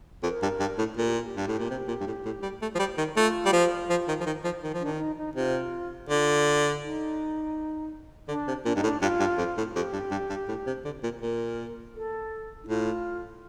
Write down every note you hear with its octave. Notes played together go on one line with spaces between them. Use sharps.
F2 A#4
G2
G2
A2
A#2 A4
G4
F4
G4
G2
A2
A#2
C3
A#2
G2
A2
A2
G3
A3
F3
G3
D#3
A3 F4
G3
F3
F3
D#3
F3
D#3
F3
D#3
F3
D#3 D4
D4
D#4
D#4
C3 F4
D3 F4
D#4
D3 D4
C3
A#2 D4
G2 D#4
A2
D4
G2 F4
G2
F2
A2
F2 G4
G2
G2
G2
A2
C3
D3
A#2
A#2 A#4
A4
D#4
A2 F4